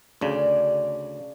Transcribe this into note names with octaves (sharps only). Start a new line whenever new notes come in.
D2 C#3 D5